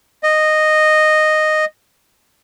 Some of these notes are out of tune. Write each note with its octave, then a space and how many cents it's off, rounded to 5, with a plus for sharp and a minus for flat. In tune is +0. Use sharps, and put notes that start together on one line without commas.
D#5 -10